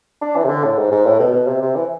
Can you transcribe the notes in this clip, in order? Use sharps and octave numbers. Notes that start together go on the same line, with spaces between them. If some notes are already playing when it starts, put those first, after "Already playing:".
D4
E3
C3
D3
A2
G#2
G#2
A2
B2
B2
C3
C3
E3